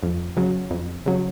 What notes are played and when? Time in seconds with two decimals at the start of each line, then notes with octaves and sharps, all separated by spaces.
0.03 F2
0.36 C#3 F#3
0.71 F2
1.06 C#3 F#3